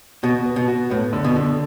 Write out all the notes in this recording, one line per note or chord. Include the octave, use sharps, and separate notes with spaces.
B2 F#4
B3
B2
F#4
A2 B3
D3
B2
D3